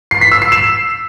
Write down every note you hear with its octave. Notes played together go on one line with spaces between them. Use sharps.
C7
B6
E6
C7
E7